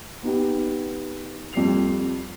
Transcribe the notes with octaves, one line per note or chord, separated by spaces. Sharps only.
B3 D#4 G4
F2 G3 C7 F7